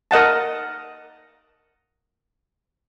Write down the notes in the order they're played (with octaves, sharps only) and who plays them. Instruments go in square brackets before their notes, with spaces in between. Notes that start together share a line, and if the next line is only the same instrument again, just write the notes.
[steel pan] A#4 D#5 F#5 A5